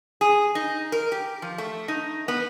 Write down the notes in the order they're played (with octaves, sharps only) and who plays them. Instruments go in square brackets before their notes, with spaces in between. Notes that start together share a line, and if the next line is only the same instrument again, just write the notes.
[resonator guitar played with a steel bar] G#4
D#4
A#4
G4
F3
A3
D#4
B3